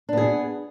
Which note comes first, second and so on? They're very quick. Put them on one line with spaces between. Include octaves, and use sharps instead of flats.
D4 B3 G#4